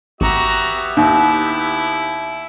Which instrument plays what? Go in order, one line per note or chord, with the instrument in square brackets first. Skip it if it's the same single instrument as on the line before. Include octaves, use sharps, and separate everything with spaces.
[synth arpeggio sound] G#1 [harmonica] B3 G4 E5 [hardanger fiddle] F#4 A#5
[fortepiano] D#2 [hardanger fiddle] E4